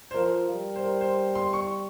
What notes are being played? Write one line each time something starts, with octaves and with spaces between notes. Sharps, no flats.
C5
F3 A#4
G3
C5
A#4
C5
C6
C#6